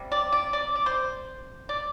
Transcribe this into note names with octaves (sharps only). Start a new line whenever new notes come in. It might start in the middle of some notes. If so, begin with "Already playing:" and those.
Already playing: C3 G3
D5
D5
D5
D5
C5
D5